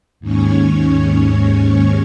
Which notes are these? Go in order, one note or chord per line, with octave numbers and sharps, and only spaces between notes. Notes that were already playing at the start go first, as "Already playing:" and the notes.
D#2 G#2 C#4 C#5